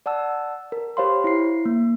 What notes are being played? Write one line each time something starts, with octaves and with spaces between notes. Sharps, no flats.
D5 F#5 A5 E6
A#4
G4 C5 C#5 F5 B5 C6
E4 C7
A#3